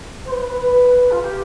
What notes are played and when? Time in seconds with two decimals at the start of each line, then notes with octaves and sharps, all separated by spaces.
0.25 C5
0.30 B4
0.40 B4
0.50 B4
0.61 B4
1.11 F4
1.22 G4